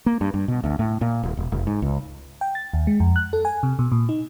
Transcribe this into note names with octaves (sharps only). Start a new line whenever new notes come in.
A#3
G2
G2
B2
D2
A2
A#2
D#1
E1
F1
G#2
C#2
G5
A6
D#2
G#3
F2
F#6
A4
G#5
C3
B2
A#2
D#4